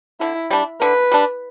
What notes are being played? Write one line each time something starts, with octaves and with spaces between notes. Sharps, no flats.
D3 E4
G3 D4
D3 B4
G3 D4